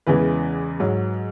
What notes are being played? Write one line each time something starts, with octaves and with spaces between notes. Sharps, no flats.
E2 C#3 E3 G#3 B4
G#2 F#3